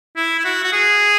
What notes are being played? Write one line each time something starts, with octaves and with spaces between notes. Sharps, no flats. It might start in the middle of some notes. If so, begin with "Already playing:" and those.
E4
E4
F#4
F#4
G#4